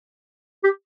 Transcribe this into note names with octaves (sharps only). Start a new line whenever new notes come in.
G4